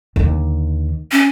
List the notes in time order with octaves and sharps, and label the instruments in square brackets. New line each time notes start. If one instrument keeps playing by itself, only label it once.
[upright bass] D#2 D3
[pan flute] C#4